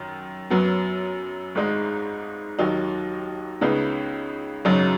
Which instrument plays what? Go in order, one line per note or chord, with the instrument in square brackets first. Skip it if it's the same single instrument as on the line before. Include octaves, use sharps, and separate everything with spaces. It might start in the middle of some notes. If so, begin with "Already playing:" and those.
Already playing: [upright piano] F#2 D#3
F#2 F#3 B3
G#1 G#2 G#3 D#4
D#2 D#3 F#3 D#4
C#2 C#3 B3 D#4
G#1 F#2 C#3 F#3 D#4